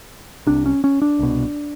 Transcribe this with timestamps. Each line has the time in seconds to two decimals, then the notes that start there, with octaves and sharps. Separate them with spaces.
0.47 C2 C3 D4
0.66 C#4
0.84 C#4
1.02 D4
1.19 C2 B2